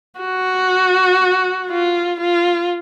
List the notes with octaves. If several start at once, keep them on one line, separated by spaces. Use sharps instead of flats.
F#4
F4
F4